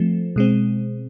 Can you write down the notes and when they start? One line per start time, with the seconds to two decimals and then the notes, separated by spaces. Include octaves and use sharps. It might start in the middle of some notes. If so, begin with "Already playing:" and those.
Already playing: F3 A3 C4
0.36 B2 G#3 C4